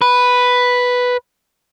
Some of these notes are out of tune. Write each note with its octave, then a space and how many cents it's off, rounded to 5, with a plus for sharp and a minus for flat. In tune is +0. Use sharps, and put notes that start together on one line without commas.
B4 +0